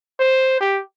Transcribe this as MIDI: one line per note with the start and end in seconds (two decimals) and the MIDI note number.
0.20 0.61 72
0.61 0.81 67